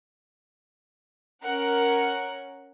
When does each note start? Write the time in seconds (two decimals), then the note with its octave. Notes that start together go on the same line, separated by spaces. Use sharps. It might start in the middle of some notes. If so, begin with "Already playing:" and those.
1.43 C#4 A#4 F#5